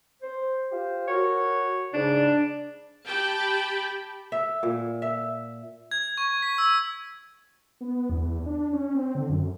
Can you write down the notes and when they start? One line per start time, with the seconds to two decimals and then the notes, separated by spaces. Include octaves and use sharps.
0.22 C5
0.71 F4 G4 C5
1.08 F#4 A#4 C#5
1.94 G#2 C#3 D4
3.07 G4 G5 A5 B5
4.32 E5
4.63 A#2
5.02 E5
5.91 G#6
6.18 C#6
6.42 B6
6.58 E6
7.81 B3
8.10 E2
8.46 D4
8.73 C#4
8.94 C4
9.15 D3
9.29 F#2